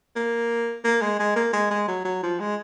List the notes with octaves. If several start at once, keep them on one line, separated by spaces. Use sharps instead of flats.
A#3
A#3
G#3
G#3
A#3
G#3
G#3
F#3
F#3
F3
G#3